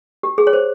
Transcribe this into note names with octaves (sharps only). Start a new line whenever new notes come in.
G4
G#4
C#5
C5